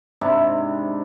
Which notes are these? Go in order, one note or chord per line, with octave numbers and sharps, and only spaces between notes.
G#2 C3 D4 E4